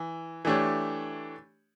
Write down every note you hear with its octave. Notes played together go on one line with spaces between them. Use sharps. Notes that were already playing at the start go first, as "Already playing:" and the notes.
Already playing: E3
E3 A3 D4 G4 C#5